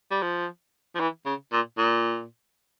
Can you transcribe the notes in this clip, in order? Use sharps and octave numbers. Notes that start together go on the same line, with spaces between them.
G3
F3
F3
E3
C#3
A#2
A#2